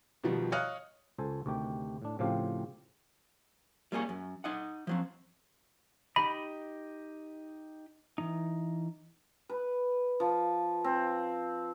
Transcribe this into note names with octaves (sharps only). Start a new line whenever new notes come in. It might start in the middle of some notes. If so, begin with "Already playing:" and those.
B2 D#3 F3 G3
C#5 D#5 F5 D#6 F6 F#6
C#2 A4 C5 G#5
D2 C3 D#3 G4 G5
A2 D4
A2 C#3 F3 C4 G4 F5
G3 A#3 G#4 C#5
F#2
D#4 D#5 F#5
F3 F#3 C4
D#4 G4 D#5 B5
E3 D#4
B4
F3
C4